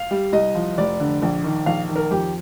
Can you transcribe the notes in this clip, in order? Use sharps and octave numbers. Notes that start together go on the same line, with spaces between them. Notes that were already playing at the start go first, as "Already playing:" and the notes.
Already playing: F5
G3
C2 D#5
F3
F1 D5
D3
A#1
D#3
A#1 F5
D#3
A#4
F2 G4